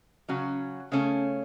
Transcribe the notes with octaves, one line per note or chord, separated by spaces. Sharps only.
C#3 F#3 C#4 F#4
C#3 A3 C#4